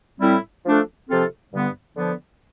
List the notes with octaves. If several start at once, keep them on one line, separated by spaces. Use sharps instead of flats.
A2 G3 C4 E4
F3 A3 D4 A4
C3 F3 C4 F4 A4
G2 D3 G3 B3
D3 F3 B3